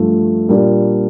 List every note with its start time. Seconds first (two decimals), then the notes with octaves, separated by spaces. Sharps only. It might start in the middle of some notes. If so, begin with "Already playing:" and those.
Already playing: G2 F3 A3
0.49 A#2 G3 A#3 D4